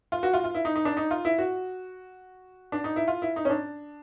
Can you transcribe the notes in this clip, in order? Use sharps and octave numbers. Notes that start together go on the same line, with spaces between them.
F4
F#4
F4
F4
E4
D#4
D#4
D4
D#4
F4
E4
F#4
D4
D#4
E4
F4
E4
D#4
C#4
D4